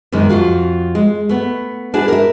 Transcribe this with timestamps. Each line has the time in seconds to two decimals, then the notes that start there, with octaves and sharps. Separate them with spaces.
0.12 F#2 C3 D#3 G#3
0.29 F2 F4 F#4 F5
0.95 G#3
1.29 A3 B3
1.94 D4 E4 F#4 G#4
2.08 A#4 E5